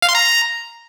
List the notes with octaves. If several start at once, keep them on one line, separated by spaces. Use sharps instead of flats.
F5
C6
A#5